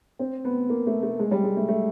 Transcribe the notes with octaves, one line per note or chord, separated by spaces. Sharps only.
C4
B3
A#3
A3
A3
G#3
G3
G#3
A3
A3